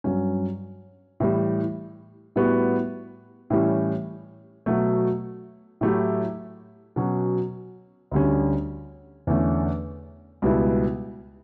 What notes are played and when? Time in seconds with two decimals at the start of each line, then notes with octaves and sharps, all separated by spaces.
0.04 G2 F#3 C#4
1.20 A2 E3 G3
2.36 A2 G3 B3 F#4
3.50 A2 E3 G3 C#4
4.66 B2 F#3 A3
5.81 A2 F#3 A3 E4 G4
6.96 B2 F#3 C#4
8.11 D2 D3 G3 C#4
9.27 E2 D3 A3 C#4
10.42 C#2 B2 G3 B3 E4